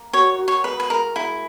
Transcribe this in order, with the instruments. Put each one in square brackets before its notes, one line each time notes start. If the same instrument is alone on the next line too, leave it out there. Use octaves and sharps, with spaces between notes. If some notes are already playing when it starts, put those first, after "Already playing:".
Already playing: [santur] A#3
[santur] F#4 [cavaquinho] C#5
[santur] F#4
[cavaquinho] C#5
[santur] G#3 [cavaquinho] B4
[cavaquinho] B4
[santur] G#3 [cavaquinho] A#4
[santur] G#3 [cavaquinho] E4